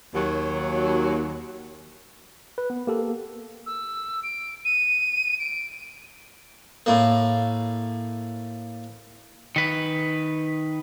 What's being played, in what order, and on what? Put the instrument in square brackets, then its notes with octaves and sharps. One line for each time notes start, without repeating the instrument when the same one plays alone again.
[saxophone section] D#2 F#3
[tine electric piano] B4
B3
A#3 G4 A4
[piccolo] E6
D7
D#7
D7
[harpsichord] A2 A#3
[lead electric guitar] D#3 B4